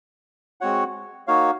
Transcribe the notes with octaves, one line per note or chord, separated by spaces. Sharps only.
G#3 C4 F#4 C#5 F#5
A#3 D#4 F#4 C#5 F5